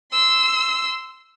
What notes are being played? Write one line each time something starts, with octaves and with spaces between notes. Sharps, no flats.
C6 E6